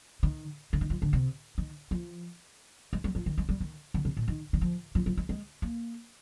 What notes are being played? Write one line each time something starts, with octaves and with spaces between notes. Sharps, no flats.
D#3
D3
D#3
F3
D3
C3
D#3
F3
G#3
G3
F3
D#3
G#3
G3
D#3
D3
C3
A#2
D#3
D#3
F3
F3
F3
G#3
G#3
A#3